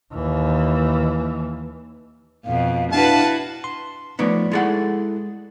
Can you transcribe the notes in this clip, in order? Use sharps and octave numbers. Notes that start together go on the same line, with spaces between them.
D#2 E3
F2 B2 F5
D4 E4 F#4 B4 F5 A5
C6
F3 A3 B3 D#4 C#5 D5
G#3 E4 A4 D5 F#5